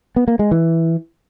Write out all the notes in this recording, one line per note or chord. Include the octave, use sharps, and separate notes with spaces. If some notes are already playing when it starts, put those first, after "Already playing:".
B3
A#3
G#3
E3